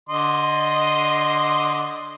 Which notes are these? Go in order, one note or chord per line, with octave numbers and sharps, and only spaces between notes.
D3 D#5 C6